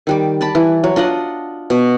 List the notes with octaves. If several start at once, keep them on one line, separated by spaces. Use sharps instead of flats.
D#3 G3 D6
D5 A5 B5
E3
F#3
D4 F4 D#5 F#5
B2